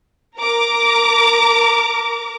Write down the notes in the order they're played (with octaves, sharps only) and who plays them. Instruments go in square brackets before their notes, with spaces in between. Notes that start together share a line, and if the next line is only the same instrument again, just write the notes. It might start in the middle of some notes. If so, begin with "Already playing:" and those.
[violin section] A#4 A#5 D6